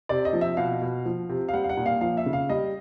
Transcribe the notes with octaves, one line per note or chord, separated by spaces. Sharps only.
C3 D5
D#5
F3
E5
B2 F5
B2
F3
C3
F5
G3 F#5
F5
F#5
A#2
F5
F3 F5
E5
C#3
F5
G3 D#5